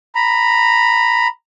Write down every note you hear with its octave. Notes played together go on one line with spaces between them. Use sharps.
A#5 B5